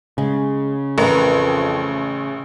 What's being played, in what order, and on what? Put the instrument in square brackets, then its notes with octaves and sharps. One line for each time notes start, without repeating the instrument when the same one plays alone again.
[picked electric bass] C#3 [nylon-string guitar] G#3
[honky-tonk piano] A1 [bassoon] F2 [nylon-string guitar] A#4 B4